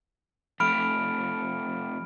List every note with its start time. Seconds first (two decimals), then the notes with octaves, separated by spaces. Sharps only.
0.60 F2 A3 B5 F6 D7